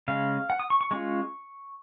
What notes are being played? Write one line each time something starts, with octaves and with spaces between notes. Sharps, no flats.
C#3 G#3 C#4 F5
F#5
D#6
C#6
C#6
G#3 C#4 F4 C#6